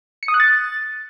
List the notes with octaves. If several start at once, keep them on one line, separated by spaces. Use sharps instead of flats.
C#7
D#6
F#6
A6